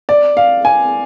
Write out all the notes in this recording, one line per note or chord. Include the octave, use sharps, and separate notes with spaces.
D5
F5
G#5